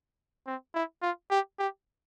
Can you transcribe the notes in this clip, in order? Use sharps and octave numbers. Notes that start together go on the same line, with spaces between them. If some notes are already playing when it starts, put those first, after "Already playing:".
C4
E4
F4
G4
G4